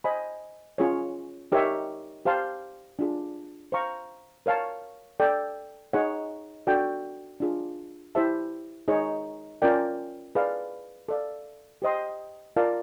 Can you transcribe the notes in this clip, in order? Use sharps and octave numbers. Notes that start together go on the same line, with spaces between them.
C5 D#5 G#5 B5
C#4 F4 G#4 C#5
D#4 G4 A#4 C#5 E5
G4 C5 F5 A5 C6
D4 F4 G#4
C5 F5 A#5 C#6
A#4 C#5 F5 A5
A4 D5 G5
D#4 G#4 C#5 F#5
D4 F#4 A4 D5 G5
D4 F4 G#4
E4 G4 C5 E5 A5
D#4 G#4 C#5
C#4 F4 A#4 D5 G5
G#4 B4 D5 F5
A4 D5 F5
G4 C5 D#5 G5 C6
F4 A#4 D5 F5 A5